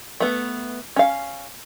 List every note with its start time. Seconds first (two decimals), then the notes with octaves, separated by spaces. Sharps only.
0.20 A3 B3
0.96 C#4 F5